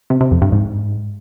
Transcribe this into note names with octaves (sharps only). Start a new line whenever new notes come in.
C3
C3
F2
G2
G#2